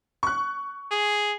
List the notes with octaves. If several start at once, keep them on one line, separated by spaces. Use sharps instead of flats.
C#6 F#6
G#4